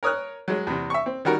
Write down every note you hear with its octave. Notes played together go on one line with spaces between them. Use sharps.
A#4 C#5 D#6 F6 F#6
F#3 G#3
E2 C3
E5 C#6
C4
D#3 G3 F#4 A#4